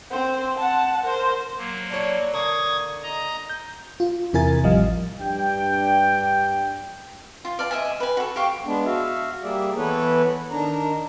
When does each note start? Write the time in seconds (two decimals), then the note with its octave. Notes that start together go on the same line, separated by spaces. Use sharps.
0.11 C4 C5
0.57 F#5 A5
1.04 A#4 C5
1.57 F#3 A#3
1.90 D4 E4 C#5
2.34 D3 A#3 C#6 D#6 G#6
3.03 D#5 A#5 D#6
3.50 G6
4.00 F4
4.33 E2 C3 E4 A#4 G#5 A6
4.63 A1 F3 G3 D#5 F5
5.19 G2 D4 G4 G5
7.45 F4
7.59 D5 F5 A5
7.71 D#5 E5 G#5
8.00 B4 G#5
8.17 F#4 A4
8.36 G4 F5 C#6 D6
8.66 G#3 B3 D4
8.86 F#4 E5 F5
9.43 G3 A#3 G#4 D5 E5
9.77 E3 B3 E4 A4 B4 C#5
10.51 D#3 D4 A#5